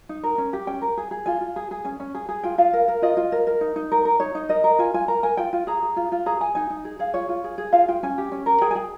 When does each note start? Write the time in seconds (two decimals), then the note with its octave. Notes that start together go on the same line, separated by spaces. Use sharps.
0.09 D#4
0.23 A#4
0.38 C#4
0.53 G4
0.67 C#4 G5
0.82 A#4
0.98 G#4
1.11 G#4
1.26 F4 G#5
1.41 F4
1.56 G#4
1.71 G#4
1.85 C#4 G#5
2.00 C#4
2.15 G#4
2.29 G#4
2.43 F4 G5
2.58 F4 F5
2.73 A#4
2.88 A#4
3.02 F4 D#5
3.17 F4
3.32 A#4
3.47 A#4
3.61 D#4
3.76 D#4
3.92 A#4
4.05 A#4
4.20 D#4 C#5
4.35 D#4
4.49 A#4 D#5
4.64 A#4
4.79 F4 G#5
4.94 F4 G#5
5.08 A#4 A#5
5.23 A#4 G#5
5.37 F4 G5
5.53 F4
5.67 G#4 A#5
5.83 G#4
5.96 F4
6.12 F4
6.26 G#4 A#5
6.40 G#4 G#5
6.55 D#4 G#5
6.70 D#4
6.85 G#4
6.99 G#4 F5
7.14 F4 C#5
7.29 F4
7.44 G#4
7.58 G#4
7.73 F4 F5
7.88 F4 G5
8.03 C#4 G#5
8.18 G4
8.32 C#4
8.46 A#4
8.61 G#4 G5
8.71 G#5
8.75 G#4 G5